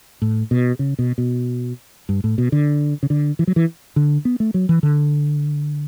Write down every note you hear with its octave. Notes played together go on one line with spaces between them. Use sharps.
A2
B2
C#3
B2
B2
G2
A2
B2
D3
C#3
D3
E3
F#3
E3
D3
B3
A3
F#3
E3
D3